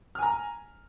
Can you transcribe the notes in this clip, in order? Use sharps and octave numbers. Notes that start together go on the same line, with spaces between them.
G#5 A#5 F6